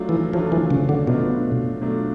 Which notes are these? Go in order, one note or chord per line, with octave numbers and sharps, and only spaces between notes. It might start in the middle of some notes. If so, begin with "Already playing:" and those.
Already playing: F#3 A3 D4 F4
E3
F3 F#3 A3 D4 F4
E3
C#3
D3
B2 F#3 A3 D4 F4
F#3 A3 D4 F4